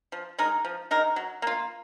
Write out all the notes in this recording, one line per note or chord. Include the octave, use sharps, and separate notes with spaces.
F3
G#3 D#4 A#4
F3
G#3 D#4 A#4
F#3
A#3 F4